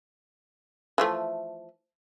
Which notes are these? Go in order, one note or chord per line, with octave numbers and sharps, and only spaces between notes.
E3 F3 A3